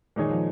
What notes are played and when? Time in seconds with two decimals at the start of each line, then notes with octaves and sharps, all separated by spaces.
0.16 A#2 D#3 G#3 D#4 G#4 C#5
0.30 F3